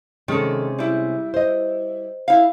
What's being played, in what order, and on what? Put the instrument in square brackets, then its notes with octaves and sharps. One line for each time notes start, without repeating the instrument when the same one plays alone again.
[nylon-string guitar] C3 G#3 C#4 [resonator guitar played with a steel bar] D#3 A4
[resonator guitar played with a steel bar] G3 E4
[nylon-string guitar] C5 D#5
[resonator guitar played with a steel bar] E4 F5